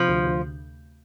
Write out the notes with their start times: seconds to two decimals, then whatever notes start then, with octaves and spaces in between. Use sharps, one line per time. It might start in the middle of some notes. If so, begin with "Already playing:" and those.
Already playing: C3 F3
0.09 D2
0.26 D2